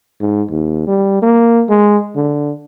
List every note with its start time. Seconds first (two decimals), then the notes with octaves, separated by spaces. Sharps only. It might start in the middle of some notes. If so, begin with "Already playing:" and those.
0.21 G#2
0.50 D#2
0.87 G3
1.22 A#3
1.69 G#3
2.16 D3